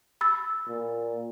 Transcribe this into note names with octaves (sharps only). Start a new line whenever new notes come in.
B5 E6 A6
A#2